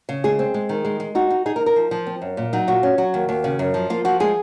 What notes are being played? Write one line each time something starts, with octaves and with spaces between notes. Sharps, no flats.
C#3
G#3 G#4
C4
G#3
D#3
G#3
G#3
D#4 F#4
D#4
D#4 G#4
A#4
D#4
A#4
F3
F3
C4
F#2
A#2
F#3 D#4
A#2 F#4
C#4
F#3 F#4
D#2
D#2
C#3
F#2
F3
A#3 F4
F3 F#4
G#3 G#4